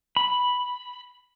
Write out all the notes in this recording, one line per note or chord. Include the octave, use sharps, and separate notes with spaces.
B5